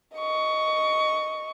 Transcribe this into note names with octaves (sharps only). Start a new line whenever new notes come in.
D#5 C#6